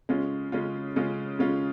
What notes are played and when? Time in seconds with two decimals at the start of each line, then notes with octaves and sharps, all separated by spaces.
0.09 C#3 G#3 C#4 F4
0.52 C#3 G#3 C#4 F4
0.96 C#3 G#3 C#4 F4
1.39 C#3 G#3 C#4 F4